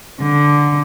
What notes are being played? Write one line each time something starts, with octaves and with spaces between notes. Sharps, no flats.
D3